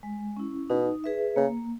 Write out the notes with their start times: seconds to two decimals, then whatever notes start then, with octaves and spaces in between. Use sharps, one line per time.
0.03 G#3
0.37 C#4 E4
0.70 B2 D#4
1.04 G#4 B4 E5
1.36 C#3 A#3